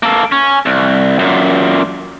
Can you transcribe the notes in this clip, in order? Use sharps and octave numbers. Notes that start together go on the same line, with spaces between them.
A#3 A4
C#4
C2
F#2 A#2